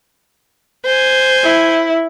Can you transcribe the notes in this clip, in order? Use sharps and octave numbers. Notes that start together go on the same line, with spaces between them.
C5 G#5
E4